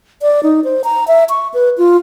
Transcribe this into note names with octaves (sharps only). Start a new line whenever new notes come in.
D5
D#4
C5
A#5
E5
C#6
B4
F4